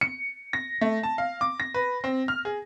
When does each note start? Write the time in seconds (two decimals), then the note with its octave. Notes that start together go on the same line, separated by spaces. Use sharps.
0.01 C#7
0.53 A#6
0.81 A3
1.03 A5
1.18 F5
1.41 D6
1.60 A#6
1.74 B4
2.04 C4
2.28 F6
2.45 G#4